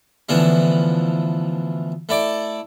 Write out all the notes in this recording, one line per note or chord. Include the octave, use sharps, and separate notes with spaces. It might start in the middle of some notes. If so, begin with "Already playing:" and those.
D2 B2 E3 F3 D4 E4
A3 E4 D5 D6